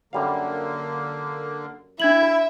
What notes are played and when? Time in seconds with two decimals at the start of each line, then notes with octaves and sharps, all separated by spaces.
0.13 F#2 D3 G3 A#3 F5
2.00 D4 E4 E5 G#6 F#7